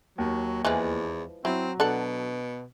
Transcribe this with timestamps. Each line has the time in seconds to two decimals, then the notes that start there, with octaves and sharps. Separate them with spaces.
0.18 D#2 F#3
0.65 E2 E3 F3 G#3
1.45 F#3 C4 E4
1.80 B2 D4 A4 F#5